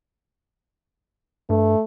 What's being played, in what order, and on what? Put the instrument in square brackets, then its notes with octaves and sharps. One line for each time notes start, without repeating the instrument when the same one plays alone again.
[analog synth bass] G2 [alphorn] A3